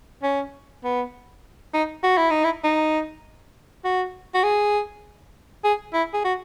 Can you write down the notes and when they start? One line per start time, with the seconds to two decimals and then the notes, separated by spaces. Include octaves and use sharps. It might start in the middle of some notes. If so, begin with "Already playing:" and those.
0.23 C#4
0.84 B3
1.74 D#4
2.03 F#4
2.18 E4
2.30 D#4
2.44 E4
2.64 D#4
3.84 F#4
4.34 F#4
4.44 G#4
5.64 G#4
5.94 E4
6.14 G#4
6.25 F#4